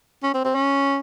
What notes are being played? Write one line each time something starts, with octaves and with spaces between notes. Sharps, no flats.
C#4
C4
C4
C#4